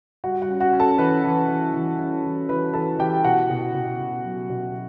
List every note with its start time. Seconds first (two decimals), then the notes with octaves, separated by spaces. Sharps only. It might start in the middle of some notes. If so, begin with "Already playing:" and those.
0.24 G3 F#4 F#5
0.42 F#4 F#5
0.48 C#4
0.60 F#4 F#5
0.73 C#4
0.79 A4 A5
0.98 E3 B4 B5
1.24 E3
1.48 E3
1.74 E3
1.99 C#4
2.24 E3
2.49 E3 B4 B5
2.74 E3 A4 A5
2.99 E3 G4 G5
3.24 B2 F#4 F#5
3.50 B2
3.75 B2
4.00 B2
4.25 F#3
4.50 B2